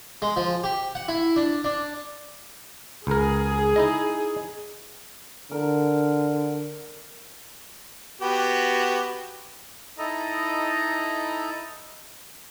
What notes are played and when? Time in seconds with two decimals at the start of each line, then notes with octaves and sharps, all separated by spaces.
0.22 G#3
0.36 F3
0.64 G4
0.95 F#5
1.08 E4
1.36 D4
1.64 D4
3.07 C#2 G#4 A#4
3.76 D#4 E4 D#5
5.51 D3 A#4
8.21 B3 F#4 G4
9.98 D#4 E4 A4 D#5 A#5